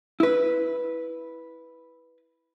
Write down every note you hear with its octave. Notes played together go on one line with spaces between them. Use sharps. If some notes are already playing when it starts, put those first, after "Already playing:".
E4 B4